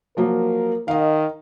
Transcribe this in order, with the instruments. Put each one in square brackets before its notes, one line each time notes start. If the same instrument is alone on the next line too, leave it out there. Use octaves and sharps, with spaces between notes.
[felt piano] F3 F#3 A#3 [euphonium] A#4
[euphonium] D#3 [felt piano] D#5 F5